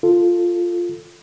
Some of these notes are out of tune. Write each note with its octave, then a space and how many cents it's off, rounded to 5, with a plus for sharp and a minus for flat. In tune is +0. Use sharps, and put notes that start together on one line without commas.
F4 +0 A4 +0